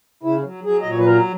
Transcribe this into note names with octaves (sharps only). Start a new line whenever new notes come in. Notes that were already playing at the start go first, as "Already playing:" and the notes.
C#3 E4
F#3
F#3 G#4
A#2 D#5
C#5
B4
F#3 A#4